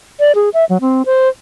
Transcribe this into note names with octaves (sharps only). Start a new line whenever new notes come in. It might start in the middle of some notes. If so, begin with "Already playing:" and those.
D5
G#4
E5
F#3
C4
C5